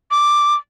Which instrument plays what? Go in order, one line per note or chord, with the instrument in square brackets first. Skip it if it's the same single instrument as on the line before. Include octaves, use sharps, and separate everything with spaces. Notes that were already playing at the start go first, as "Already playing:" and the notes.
[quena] D6